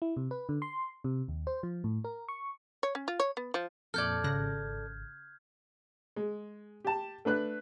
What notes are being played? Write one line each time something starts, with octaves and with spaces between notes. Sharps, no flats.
E4
C3
B4
D3
C6
C3
D#2
C5
F3
A2
A#4
C#6
C#5
C#4
F4
C#5
B3
F3
F2 A#2 A4 D5 F6 G6 G#6
G#1 C#3 F#6 A#6
G#3
G4 A5
A3 D4 B4 F#6